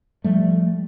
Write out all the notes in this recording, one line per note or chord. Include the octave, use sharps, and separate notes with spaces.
F3 G3 A3